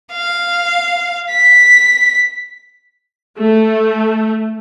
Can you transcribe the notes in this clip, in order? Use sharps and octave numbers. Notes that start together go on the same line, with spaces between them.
F5
B6
A3